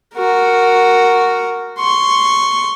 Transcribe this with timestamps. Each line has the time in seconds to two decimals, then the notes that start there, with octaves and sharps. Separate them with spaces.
0.15 F#4 A#4
1.79 C6 C#6